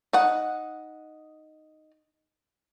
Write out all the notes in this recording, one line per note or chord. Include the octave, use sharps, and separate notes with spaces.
D#4 F#5